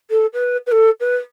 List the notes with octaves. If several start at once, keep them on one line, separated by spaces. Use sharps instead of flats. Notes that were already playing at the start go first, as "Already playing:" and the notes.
A4
B4
B4
A4
B4